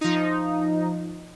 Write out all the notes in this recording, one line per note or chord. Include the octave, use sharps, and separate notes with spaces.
F3 D#4